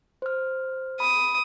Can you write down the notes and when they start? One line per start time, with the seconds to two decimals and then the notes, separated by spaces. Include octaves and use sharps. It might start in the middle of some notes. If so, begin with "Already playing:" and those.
0.22 C5 F6
1.00 B5 D#6